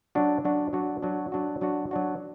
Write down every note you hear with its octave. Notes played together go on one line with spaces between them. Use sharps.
F#3 D4 F#4
F#3 D4 F#4
F#3 D4 F#4
F#3 D4 F#4
F#3 D4 F#4
F#3 D4 F#4
F#3 D4 F#4